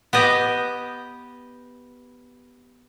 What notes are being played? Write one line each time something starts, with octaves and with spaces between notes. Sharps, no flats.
B3 G4 D#5